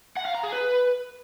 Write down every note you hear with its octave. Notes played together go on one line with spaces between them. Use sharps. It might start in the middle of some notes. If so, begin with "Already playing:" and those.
F#5
F5
A#5
G#4
B4